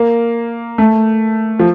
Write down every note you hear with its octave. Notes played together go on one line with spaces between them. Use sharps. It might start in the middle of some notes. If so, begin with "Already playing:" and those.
Already playing: A#3
A3
F3